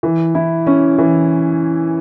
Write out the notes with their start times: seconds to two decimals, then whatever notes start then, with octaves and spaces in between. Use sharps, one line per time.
0.03 E3
0.35 E4
0.67 C#4
0.98 E3